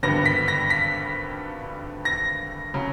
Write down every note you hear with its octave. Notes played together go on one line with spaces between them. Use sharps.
G#1 G2 D3 G3 B3 A#6
B6
A#6
B6
A#6
C#3 F#3